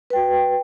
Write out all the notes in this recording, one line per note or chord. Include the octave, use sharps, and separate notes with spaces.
F#4 B4 G5